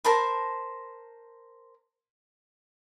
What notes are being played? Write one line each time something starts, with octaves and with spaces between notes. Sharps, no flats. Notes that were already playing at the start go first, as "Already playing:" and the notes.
A#4 C5 A5 B5